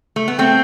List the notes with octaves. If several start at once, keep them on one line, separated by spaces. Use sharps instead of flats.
A3
B3
A3 C4 G5